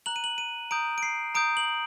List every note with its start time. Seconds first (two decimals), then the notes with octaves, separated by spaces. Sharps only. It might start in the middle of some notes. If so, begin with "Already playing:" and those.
0.06 A#5 F#6 F#7
0.16 D#7
0.24 F#7
0.38 D#7
0.71 A#5 D#6 G6 D7
0.98 D7
1.03 C7
1.35 A#5 D#6 G6 D7
1.57 F#7